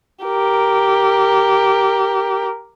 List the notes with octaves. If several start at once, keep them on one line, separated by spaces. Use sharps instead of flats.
G4 A#4